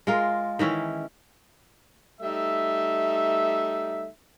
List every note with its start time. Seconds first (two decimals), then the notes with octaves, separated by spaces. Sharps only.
0.07 G#3 F4 A#4
0.59 D#3 E3 C#4 E4
2.22 G3 A3 D#4 E5